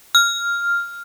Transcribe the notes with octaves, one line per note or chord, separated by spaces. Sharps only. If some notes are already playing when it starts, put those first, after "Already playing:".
F6